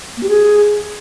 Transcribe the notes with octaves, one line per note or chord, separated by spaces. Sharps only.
A#3
G4
G#4